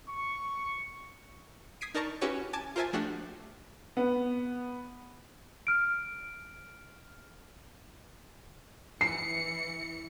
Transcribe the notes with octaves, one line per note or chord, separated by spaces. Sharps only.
C#6
D#6 G#6 B6 C7 D7 D#7
D#4 A#4 D5 A5 A#5 C#6
C#4 E4 F#4 G4 B4 C#5
G#5 A5 D6 G#6
F4 A#4 C5 E5 G#5 A5
F3 A3 D4 F#4 G4 C7
B3
F6 D7
E3 C7 C#7